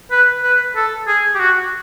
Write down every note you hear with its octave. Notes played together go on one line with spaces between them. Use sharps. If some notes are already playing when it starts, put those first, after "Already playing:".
B4
B4
A4
G#4
G4
F#4